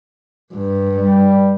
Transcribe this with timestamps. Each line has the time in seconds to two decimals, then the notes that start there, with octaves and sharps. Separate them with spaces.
0.54 G2
0.96 G3